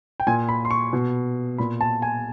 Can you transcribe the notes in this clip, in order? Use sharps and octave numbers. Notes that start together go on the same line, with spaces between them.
G5
A#2 G#5
B5
C6
C#6
B2
A#2 B5
A5
G#5